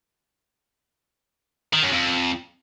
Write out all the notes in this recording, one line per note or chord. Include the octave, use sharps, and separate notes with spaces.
D#3
F#2
F2